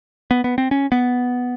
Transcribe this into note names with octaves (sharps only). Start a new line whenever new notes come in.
B3
B3
C4
C#4
B3